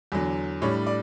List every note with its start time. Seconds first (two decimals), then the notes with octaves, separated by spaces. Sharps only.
0.12 E2 D3 F#3
0.62 A2 G3 D4 C#5
0.87 D5